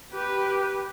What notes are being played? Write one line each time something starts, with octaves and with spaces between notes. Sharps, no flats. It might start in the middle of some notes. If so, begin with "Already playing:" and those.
G4 B4